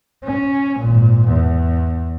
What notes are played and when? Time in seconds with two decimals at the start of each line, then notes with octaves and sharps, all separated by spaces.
0.24 C#4
0.79 G#1 A#2
1.28 E2